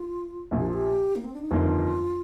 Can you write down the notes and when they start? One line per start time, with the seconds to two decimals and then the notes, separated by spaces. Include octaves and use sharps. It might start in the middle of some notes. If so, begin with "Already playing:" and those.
Already playing: F4
0.51 A#1 A#2 F3
0.59 G4
0.66 F4
0.73 G4
1.16 A#3
1.24 C4
1.34 D4
1.42 D#4
1.51 G1 F2 D#3 A#3 F4